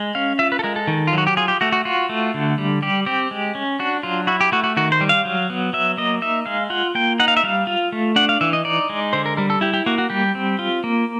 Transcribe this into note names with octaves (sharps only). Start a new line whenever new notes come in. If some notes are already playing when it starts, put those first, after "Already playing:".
Already playing: G#3
C#4 F5
F4 E5
B4
A4
G#3 A#4
A4
D#3
F4
F#3 F#4
G4
F4 G#4
G4
A3 F#4
F#4
F4 F#4
A3
D3
G3
G3 G4
C4 G4
G#3
C#4
D4 F#4
F#3 F4
E4 F#4
G4
A3 F#4
F#4
D#3 F#4
C5
G3
F5
F#3
B3
F#3 E5
A#3 D#5
D#4 E5
G#3 F5
F4 F#5
A#3 G5
D#4 F#5
F5
E5
G3 F5
F4
A3
D4 F#5
F5
E3 E5
D#5
D#4 D5
G#3
D3 C5
A#4
G3 A#4
A4
E4 G4
G4
A#3 F#4
F#4
G3 G4
C4
F4
A#3